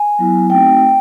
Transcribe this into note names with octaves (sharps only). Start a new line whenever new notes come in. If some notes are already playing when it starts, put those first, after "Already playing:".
Already playing: G#5
F#3 B3 E4
A3 C4 D#4 F#4 G5